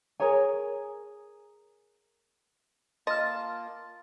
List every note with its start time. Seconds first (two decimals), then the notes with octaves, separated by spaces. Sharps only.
0.20 G#4 A#4 C#5 G#5
3.07 A#3 F4 D#5 A5 C6 F6